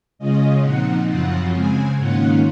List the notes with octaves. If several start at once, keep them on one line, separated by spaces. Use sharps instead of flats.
C#3 G#3 C#4 F4 D#5
A#2 F3 C4 D#4 F#5
F#2 C#3 F3 C4 F4 F#5
C#3 G#3 C4 G#5
G#2 D#3 A#3 C#4 F4 F#5